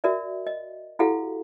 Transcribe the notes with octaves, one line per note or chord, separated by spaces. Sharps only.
F#4 A#4 D5 E5
D#5
E4 F#4 G4 A4 F5 F#5